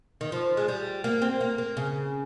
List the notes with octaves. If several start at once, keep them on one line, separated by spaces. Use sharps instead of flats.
D#3
F3
G#3
G3
A#3
C4
A#3
A#3
C#3